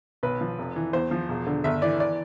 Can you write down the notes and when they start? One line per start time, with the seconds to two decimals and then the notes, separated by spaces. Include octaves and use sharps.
0.23 B1 B4
0.41 F3
0.59 F1
0.76 E3
0.93 E2 C5
1.11 F3
1.29 E1
1.47 D3
1.64 G1 E5
1.82 E3 D5
2.00 D5